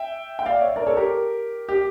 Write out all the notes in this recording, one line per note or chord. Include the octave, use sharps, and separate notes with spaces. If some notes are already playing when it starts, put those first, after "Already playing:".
Already playing: E5 G5
G5
D5 F5
C#5 E5
A#4 D5
A4 C#5
G4 A#4
G4